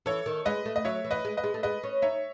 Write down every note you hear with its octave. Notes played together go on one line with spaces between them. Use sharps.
E3 A4 C#5
D#3
G#3 B4 D#5
A3
D#5
F#3 C#5 E5
E3
B4 D#5
G#3
B4 D#5
G#3
A3
G#3 B4 D#5
C#4
D#4 C#5 E5